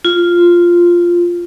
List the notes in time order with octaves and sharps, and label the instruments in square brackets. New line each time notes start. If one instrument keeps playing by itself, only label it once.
[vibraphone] F4